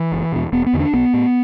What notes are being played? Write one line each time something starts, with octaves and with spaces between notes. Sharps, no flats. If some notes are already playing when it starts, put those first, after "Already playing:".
Already playing: E3
F#1
E2 B2
E1 B3
B3
E2 D3
D4
B1 B3
A2